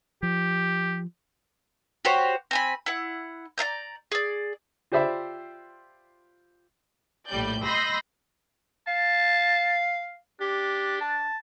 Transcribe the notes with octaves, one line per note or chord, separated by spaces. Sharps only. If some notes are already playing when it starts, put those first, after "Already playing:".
F3 G4
F#4 G4 C5 C#5
C4 G#5 B5
E4 F#5
D5 F5 A#5 G6
G#4 D5
F4 G4 C5 D5 E5 B5
A#1 A2 G3 D5 G6
D#5 B5 C6 E6 G6 A#6
F5 A5
D4 G4
A5